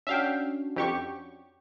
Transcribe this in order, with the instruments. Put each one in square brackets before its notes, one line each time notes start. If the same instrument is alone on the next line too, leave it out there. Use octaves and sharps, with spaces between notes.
[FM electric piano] C#4 D4 F#4 [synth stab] E5 F5 G5
[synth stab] F2 G4 C#6